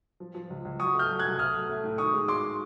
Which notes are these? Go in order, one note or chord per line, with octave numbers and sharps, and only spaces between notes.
F3
F3
C#2
C#2
F#3 C#6 D#6
A3
F6 G6
F#3
F#6 G#6
C2
A3 D#6 F6
F#3
A3
A2
D#3 C#6 D#6
G#3
G#3 C6 D6